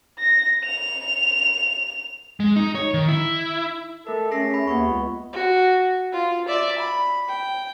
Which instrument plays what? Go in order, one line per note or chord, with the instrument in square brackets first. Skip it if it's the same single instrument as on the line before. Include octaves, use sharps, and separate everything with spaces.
[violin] A#6
F7
[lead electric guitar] G#3
D#4
C#5
D#3
E4
[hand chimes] A3 A#4 [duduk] A4 [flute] E5
[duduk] A3 [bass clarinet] C#4 [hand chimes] G#4 A#6 C7
[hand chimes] B5
[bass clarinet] D#2 [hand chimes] A#3 B5 C#6 [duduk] B3
[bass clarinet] C#2
[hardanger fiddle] F#4
F4
D5 E5
B5
G5